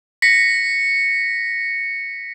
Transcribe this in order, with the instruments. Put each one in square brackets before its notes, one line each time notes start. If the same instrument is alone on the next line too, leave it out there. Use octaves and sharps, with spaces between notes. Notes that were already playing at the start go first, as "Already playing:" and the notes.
[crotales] A#6 B6 C#7